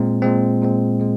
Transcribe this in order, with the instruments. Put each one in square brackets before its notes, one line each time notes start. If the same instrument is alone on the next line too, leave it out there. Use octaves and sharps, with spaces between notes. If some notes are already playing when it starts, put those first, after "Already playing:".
Already playing: [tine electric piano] A#2 G#3 C4
A#2 G#3 C4
A#2 G#3 C4
A#2 G#3